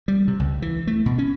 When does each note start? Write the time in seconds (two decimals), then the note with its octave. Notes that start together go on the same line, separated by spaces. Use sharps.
0.08 G3
0.28 C3
0.40 C#2
0.62 E3
0.87 A3
1.06 B2
1.18 C#4